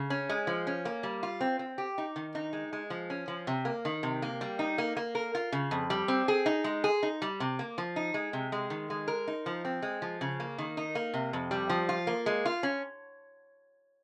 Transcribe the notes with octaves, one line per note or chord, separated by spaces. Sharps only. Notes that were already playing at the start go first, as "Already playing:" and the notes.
Already playing: C#3
C#4
G#3
F3
C#4
A#3
G3
F4
C4
C4
G4
D#4
D#3
D#4
G#3
G#3
F3
C#4
F3
C3
A#3
D#3
C3
A#3
G3
D#4
A#3
A#3
A#4
F4
C#3
F2
G3
C4
G#4
D#4
G#3
G#4
D#4
G3
C3
A#3
F3
D#4
G#3
C3
G#3
D#3
G#3
A#4
D#4
F3
C4
G#3
F3
C#3
A#3
D#3
D#4
A#3
C3
F2
G3
F3
F4
A#3
G#3
F4
C#4